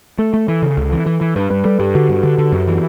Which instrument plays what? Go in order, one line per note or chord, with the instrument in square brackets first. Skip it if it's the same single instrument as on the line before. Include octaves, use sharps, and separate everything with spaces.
[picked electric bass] A3 [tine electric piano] A4
[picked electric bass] A3
E3
C#3
C#2
E3
E3
E3
[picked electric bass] G2 [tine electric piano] B4
[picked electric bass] G2 [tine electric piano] B4
[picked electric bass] G3 [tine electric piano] A4
[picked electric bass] G2 [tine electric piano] G4
[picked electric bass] D3 [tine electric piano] F#4
[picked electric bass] G2
D3
D3
F#2
E3